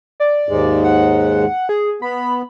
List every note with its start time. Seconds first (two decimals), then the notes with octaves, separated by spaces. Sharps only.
0.20 D5
0.49 D#2 G#2 G#3
0.84 F#5
1.69 G#4
2.02 B3 B5